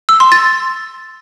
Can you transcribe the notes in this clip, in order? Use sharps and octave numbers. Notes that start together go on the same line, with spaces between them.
E6
C6
A6